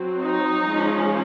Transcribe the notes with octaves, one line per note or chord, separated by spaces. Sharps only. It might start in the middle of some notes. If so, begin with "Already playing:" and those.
Already playing: F#3 C4
D#4
F3 G#3 C#4